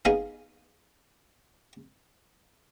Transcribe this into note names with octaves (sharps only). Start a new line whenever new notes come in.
B3 D#4 G#4 D#5 F5